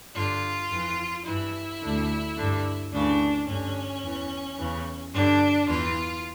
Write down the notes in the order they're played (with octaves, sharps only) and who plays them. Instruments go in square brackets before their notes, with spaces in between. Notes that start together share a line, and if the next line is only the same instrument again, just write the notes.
[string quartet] G2 D3 F4
F2 E3
G2 E3 E4
D2 D3
G2 D3
D2 C#3 E3 D4
G2 D3 C#4
E2 E3
E2 C#3 E3
G2 D3 D4
E2 E3 F4